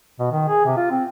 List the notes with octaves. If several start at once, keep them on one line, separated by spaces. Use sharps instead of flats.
B2
D#3
G#4
C3
F4
C4